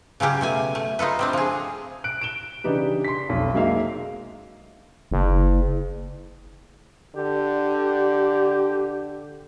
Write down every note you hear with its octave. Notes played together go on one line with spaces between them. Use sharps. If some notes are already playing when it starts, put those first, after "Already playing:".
C#3 F#3 C#4 G4
B2 A3 G#5
A3
D#4 F4 A4 B4
G3 C4 D4
F3 G#4
F#6 D7
D7 E7 G7
C#3 E3 D4 D#4 G4 B4
C6 B6
F1 B1
F#3 G#3 A#3 D#4 E5 F5
F#1
D3 G4